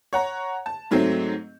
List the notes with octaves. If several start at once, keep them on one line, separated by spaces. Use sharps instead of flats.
C#5 F#5 A#5
A5
G#2 F#3 A3 C4